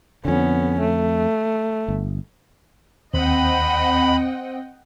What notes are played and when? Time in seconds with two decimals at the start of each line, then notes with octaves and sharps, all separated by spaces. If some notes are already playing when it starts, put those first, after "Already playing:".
0.25 F2 D3 B3 C#4
0.80 A3
1.88 G1
3.14 D#2 C4 D#5 F#5 G5 B5